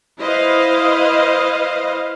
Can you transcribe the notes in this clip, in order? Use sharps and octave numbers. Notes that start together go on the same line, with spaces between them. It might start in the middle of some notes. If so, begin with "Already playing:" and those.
E4 B4 C5 D#5 F5